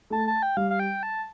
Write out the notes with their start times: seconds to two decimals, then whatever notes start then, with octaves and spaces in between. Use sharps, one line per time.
0.10 A3 A5
0.28 A5
0.43 G5
0.57 G3 F5
0.71 F5
0.80 G5
1.03 A5